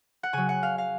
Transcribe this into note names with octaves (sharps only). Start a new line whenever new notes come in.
F#5
C#3 F#3 G#5
F#5
F5
F5